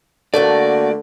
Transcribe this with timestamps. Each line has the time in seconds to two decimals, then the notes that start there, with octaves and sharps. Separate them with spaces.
0.34 D3 A3 A#3 F#4 D5